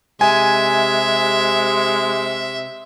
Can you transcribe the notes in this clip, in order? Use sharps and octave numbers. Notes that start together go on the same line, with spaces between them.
C3 G#3 E5 G#5